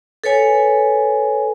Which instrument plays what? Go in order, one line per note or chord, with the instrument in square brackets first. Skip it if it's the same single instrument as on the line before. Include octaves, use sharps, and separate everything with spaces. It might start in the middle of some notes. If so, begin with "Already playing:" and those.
[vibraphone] A4 B4 C#5 G#5